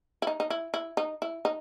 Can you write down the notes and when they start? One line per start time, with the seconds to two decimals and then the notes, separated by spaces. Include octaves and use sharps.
0.22 E4
0.27 D#4
0.40 D#4
0.50 E4
0.74 E4
0.97 D#4
1.22 E4
1.45 D#4